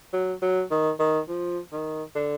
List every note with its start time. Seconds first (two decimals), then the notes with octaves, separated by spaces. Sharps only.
0.13 F#3
0.42 F#3
0.71 D#3
0.99 D#3
1.29 F3
1.72 D#3
2.15 D3